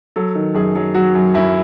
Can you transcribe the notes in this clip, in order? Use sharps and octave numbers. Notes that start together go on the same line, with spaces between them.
F#3 A4
D#3
F#2 G#4
F#3
F#3 F#4
F#2
F#2 E4